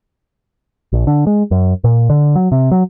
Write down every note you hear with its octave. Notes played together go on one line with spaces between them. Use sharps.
A#1
D3
G#3
F#2
A#2
D3
F#3
C3
F#3